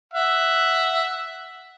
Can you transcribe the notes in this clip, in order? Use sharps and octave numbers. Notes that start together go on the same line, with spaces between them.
E5 F#5